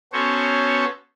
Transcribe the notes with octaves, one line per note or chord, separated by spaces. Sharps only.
B3 C#4 F#4 A4 C5 C#5